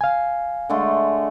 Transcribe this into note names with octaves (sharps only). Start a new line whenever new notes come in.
F5 G#5
D3 G#3 A3